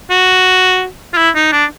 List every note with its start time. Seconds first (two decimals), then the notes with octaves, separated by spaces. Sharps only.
0.10 F#4
1.13 F4
1.17 E4
1.35 D#4
1.52 D4